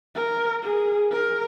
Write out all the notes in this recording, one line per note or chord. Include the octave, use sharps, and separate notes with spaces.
A#4
G#4
A#4